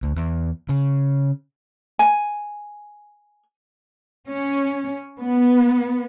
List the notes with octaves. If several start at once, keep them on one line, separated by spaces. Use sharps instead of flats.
D2
E2
C#3
G#5
C#4
B3